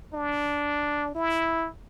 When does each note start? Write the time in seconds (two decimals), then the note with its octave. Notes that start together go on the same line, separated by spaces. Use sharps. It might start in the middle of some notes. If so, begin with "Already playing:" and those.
0.14 D4
1.15 E4